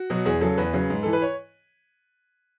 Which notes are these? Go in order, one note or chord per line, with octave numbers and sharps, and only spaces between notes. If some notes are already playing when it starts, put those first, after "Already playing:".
Already playing: F#4
B2 F#3
E2 G#4
C#3 F#3 A4
E2 B4
C#3 F#3
G#2
E3 A4
B4
C#5